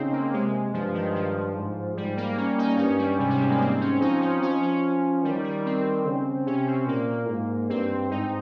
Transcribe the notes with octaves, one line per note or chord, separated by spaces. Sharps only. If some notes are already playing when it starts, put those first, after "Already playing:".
Already playing: C#3 C4 D#4
A#3
C3 G#3
G2 F3
D#3
F3
G#2
G#2 G3
A#3
C#4
D#4
G2 C#4
G3
G#2 C3
G3
G#3
A#3
C4
C#4
F3 D#4
C#4
F3 C#4
C#4
D#3 G3
G3
C4
C#3
C3 C#4
C4
A#2 A#3
G#2
G2 C4
G#2 D#4